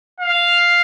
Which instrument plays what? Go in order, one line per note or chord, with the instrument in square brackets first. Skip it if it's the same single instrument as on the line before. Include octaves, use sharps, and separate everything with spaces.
[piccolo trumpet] F5